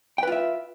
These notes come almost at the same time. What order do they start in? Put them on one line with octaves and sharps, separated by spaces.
G5 B4 F4 E5